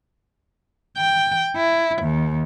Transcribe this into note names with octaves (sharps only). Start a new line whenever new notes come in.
G5
E4
D#2